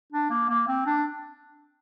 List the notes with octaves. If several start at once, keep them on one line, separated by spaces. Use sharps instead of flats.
D4
A#3
A#3
C4
D4